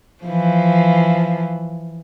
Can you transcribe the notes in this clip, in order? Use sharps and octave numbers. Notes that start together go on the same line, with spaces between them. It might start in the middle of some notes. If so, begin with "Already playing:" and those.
E3 F3